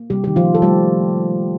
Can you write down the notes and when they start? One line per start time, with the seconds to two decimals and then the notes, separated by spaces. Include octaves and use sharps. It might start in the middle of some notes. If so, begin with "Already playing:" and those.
Already playing: A#3
0.10 C3 G3 G4
0.24 D#3 G4
0.36 F3 F4
0.45 A#3
0.55 A4
0.62 G3 A3 G4